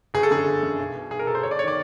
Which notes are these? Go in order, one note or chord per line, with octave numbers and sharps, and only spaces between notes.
G1 G#4
A4
F#2 D3 G#4
G1
F#2 D3
B1
B2
B1 G#4
A#4
B2 A4
C5
G1 C#5
D5
C#5
D#3 D5